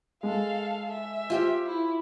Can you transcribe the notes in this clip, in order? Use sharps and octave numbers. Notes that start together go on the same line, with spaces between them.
G#3 A4 F5
E5
F4 G4 C5
E4